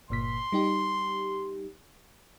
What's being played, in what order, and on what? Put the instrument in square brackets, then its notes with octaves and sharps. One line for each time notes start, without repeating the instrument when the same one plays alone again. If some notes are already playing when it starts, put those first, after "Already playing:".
[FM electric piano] G1 A#2 B6 [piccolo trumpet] C6
[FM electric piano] G3 D#4 G4